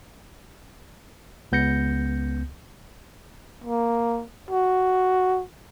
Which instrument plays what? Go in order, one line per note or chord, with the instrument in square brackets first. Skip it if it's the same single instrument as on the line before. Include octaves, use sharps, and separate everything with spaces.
[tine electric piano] C#2 B3 G6 A#6 C#7
[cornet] A#3
F#4